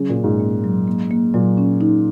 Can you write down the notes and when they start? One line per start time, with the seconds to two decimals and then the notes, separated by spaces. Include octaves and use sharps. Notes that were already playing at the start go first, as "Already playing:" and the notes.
Already playing: C#3 F#3
0.09 A#2
0.17 C#4
0.24 G#2
0.40 A#3
0.64 F#3
0.87 A#3
1.11 A#3
1.34 A#2 F#3
1.57 C#4
1.81 D#4